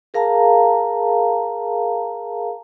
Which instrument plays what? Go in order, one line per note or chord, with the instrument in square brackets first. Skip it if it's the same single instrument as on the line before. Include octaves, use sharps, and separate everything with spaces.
[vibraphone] G#4 A#4 F5 A5 A#5